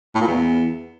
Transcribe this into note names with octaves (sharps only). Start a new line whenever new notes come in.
A2
A#2
E2